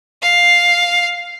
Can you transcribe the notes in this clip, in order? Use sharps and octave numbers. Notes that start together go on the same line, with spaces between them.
F5